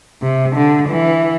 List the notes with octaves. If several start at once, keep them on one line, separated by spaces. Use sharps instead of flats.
C3
D3
E3